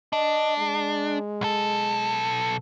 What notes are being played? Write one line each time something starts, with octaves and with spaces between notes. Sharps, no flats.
D4 D#5
G#3
B1 A4